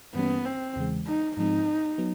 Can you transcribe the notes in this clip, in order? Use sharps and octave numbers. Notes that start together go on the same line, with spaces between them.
G2 E3 G3 A#3 B3 C#4
C4
E2 C#3 E3 G#3
D#4
G#2 F3 G#3 C4 D#4
F#3 B3